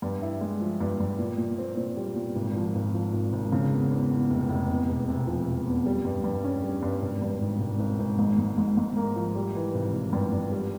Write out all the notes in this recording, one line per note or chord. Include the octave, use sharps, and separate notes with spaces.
G2
E4
G#3
F3
G2
G2
A#2
A#2
C4
A#2
G3
A#2
G#1
F3
G#1
F3
G#1
G#1
C#3
E2
E2
E2
F1
F1
E2
E1
C3
F3
C3
E2
G3
G2
G2
C#4
G3
G2
G#1
G2
G#1
G#1
G#1
G#1
G#2
G#2
G#2
G#2
A#3
F3
G3
E3
G#1
G#1
G2
G2
G3